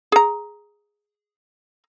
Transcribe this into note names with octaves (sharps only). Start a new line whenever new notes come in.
G#4 A#5